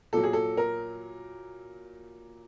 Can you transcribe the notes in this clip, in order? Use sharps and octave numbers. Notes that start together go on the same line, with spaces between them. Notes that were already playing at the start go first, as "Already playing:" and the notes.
A#2 F#3 A4
G#4
A4
A#4